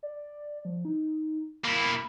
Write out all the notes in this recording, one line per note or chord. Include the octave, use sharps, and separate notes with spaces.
D5
F3
D#4
A#3 E4 B5